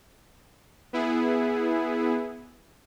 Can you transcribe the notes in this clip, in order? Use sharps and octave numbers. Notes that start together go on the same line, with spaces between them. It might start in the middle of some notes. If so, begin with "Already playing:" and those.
B3 E4 G#4